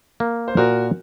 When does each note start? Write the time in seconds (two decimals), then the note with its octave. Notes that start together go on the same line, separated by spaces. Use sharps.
0.20 A#3
0.48 C5
0.57 A#2 F#4 A#4